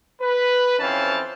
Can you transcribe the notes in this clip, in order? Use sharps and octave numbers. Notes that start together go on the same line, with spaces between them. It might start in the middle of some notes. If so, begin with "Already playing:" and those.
B4
F2 E3 C4 C#4 F5 A5